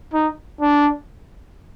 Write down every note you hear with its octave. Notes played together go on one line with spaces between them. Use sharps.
D#4
D4